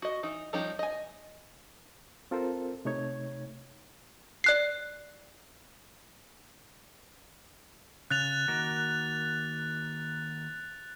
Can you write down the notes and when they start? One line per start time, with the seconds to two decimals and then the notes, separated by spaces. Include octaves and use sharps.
0.02 F#4 D#5
0.23 E3 D#4
0.53 F3 G3 C#4 D#4 G4
0.79 D#5 G#5
2.31 C4 F4 A4 A#4 C5
2.85 C3 A3 D#4 C#5 G#6
4.44 D5 F#6 C7
8.11 C#3 F#6 A6 F7
8.48 D#3 A#3 F#4